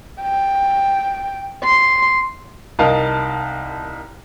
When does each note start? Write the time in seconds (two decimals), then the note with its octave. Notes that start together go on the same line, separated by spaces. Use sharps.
0.21 G5
1.64 C6
2.79 C2 D#4 A#4 F5 A5